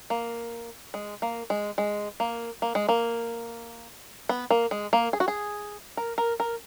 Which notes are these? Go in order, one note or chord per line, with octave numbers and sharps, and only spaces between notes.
A#3
G#3
A#3
G#3
G#3
A#3
A#3
G#3
A#3
B3
A#3
G#3
A#3
G#4
F#4
G#4
A#4
A#4
A#4